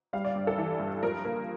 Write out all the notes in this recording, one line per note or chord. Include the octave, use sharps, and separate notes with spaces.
G3 F5
D5
G2
A4
E3
G2
F3 A#4
A#3